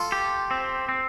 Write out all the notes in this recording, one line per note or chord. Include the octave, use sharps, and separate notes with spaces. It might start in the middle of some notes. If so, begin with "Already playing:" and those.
Already playing: F4 A4
G4
C4
C4